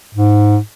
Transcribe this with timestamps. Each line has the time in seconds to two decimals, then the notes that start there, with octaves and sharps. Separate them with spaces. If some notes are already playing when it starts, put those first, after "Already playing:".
0.15 G#2